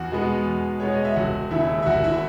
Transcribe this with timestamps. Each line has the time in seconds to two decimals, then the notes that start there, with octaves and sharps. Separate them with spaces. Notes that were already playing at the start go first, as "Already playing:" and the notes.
Already playing: E2 F#4 F#5
0.12 B2 G#3 B3
0.46 E2
0.80 B2 G#3 B3 C#5
0.92 D#5
1.05 E5
1.16 E1 F#4 F#5
1.51 D#2 C#3 E4 E5
1.82 E5
1.86 E1 F#4 F#5
2.03 E4 E5